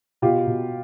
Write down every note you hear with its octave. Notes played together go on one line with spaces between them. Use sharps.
B2 F4 G4
B2